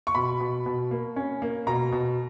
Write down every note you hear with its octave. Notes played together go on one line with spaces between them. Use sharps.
C#6
B2 B5
B2
B2
A#3
C#4
A#3
B2 A#5
B2